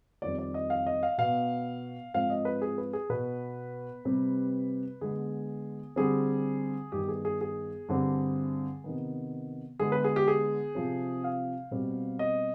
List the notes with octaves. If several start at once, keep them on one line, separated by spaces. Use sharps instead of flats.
F2 D#3 G3 C4 D5
D5
D#5
F5
D#5
F5
B2 B3 F5
G#2 F3 C4 F5
D#5
B4
G#4
B4
G#4
B2 B3 B4
C3 G3 C4
D3 G#3 B3 G#4
D3 G3 C4 G#4
G2 D#3 G3 B3 G4
G#4
G#4
G#4
G2 D3 G3 C4
C3 D#3 B3
D3 G#3 B3 G#4
B4
G#4
G4
G#4
C3 F3 C4
F5
B2 G3 C4
D#5